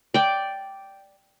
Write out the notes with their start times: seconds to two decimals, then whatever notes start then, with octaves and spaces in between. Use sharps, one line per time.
0.14 D5 G5